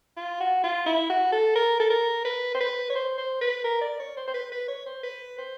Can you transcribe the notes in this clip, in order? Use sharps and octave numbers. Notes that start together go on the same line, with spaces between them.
F4
F#4
F4
E4
F#4
A4
A#4
A4
A#4
B4
C5
B4
C#5
C5
C5
B4
A#4
D5
C#5
C5
C5
B4
B4
C#5
C5
B4
C5